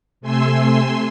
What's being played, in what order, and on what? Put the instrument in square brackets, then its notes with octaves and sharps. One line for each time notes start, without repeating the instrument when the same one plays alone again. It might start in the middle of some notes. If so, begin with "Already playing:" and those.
[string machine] C3 A3 G#5 C6 E6